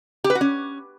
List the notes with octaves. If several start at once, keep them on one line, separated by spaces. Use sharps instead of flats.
G4
B4
F#4
C#4